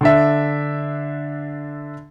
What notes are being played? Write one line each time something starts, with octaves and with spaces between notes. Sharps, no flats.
D3 D4 E5